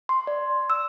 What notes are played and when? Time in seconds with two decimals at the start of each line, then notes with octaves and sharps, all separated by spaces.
0.09 C6
0.27 D5
0.70 E6